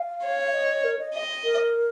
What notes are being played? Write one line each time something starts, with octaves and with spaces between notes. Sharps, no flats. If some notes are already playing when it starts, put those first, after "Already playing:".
Already playing: F5
C#5
D#5
A#4
D#5
D#5
A#4